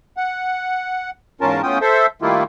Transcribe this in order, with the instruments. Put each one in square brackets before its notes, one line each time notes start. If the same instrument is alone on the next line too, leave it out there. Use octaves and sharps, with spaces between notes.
[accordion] F#5
E2 G#2 C#4 F4 A#4 A5
A2 B3 C#4 F4 G5 D#6
A4 C5 E5
D#3 G3 A3 A#3 E4 F4